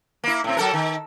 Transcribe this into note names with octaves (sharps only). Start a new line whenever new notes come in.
A#3 E4
A2 C4
F#3 A4 A#4
D#3